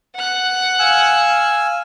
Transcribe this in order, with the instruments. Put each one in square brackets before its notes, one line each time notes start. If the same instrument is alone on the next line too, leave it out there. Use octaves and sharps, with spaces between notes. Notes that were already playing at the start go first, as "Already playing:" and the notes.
[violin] F#5 F#6
[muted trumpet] F5 [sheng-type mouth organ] G#5 E6